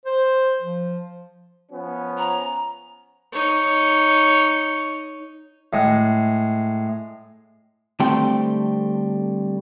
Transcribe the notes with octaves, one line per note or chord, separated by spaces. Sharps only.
C5
F3
F3 B3 C#4
A#5
D#4 C#5
A2 G#3
D3 G3 A3 C4 G5